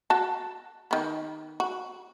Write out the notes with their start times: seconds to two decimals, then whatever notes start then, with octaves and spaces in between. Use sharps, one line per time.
0.10 F#4 A5
0.91 D#3 B3
1.60 F#4